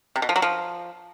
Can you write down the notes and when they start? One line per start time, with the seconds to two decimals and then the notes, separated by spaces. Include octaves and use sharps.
0.16 C3
0.22 B2
0.29 F3
0.36 F#3
0.42 F3